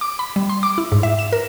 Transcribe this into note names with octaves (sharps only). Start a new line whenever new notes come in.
D6
B5
G3
C6
D6
E4
G#2
E5
E7
A#4